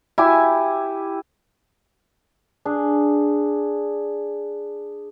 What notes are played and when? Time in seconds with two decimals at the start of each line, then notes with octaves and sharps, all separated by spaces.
0.18 E4 G4 G#5
2.65 D4 G#4